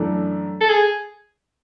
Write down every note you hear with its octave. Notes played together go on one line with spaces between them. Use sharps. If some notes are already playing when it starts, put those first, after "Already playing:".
Already playing: F#2 E3 A3 D4
A4
G#4